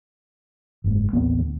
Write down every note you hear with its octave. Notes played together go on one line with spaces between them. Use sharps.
F#1 G#2
A1 D#2 B3 C4
D2